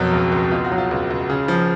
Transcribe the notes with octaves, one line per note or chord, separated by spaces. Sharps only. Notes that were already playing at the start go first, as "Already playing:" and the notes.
Already playing: F2 B2 F#3 A#4
C#2
C#2
B2 F4
F#4
F#3
F4
C#2
C#2
C#3
F3